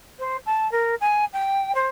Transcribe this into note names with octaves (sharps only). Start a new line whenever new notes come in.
C5
A5
A#4
G#5
G5
C5